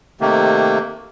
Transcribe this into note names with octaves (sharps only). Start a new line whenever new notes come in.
C3 D#3 A3 A#3